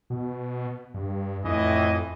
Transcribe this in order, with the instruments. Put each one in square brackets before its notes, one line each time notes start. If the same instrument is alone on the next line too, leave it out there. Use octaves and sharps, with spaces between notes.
[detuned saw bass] B2
G2
[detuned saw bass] F2 [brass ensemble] A2 E3 D#5